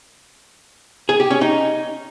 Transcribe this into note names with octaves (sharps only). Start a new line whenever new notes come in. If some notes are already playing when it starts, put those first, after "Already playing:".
G#4
G4
C#4
D#4